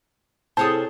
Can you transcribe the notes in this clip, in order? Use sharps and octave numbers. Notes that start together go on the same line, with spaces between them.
C3 E4 G#4 A4 C5 C#5 A5 D#6